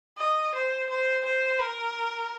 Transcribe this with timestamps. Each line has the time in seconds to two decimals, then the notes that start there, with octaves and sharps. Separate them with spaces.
0.18 D#5
0.54 C5
0.89 C5
1.25 C5
1.61 A#4